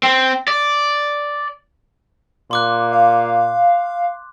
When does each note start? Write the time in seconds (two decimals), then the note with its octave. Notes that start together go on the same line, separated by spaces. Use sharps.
0.03 C4
0.48 D5
2.51 A#2 C6 D6 F#6
2.92 F5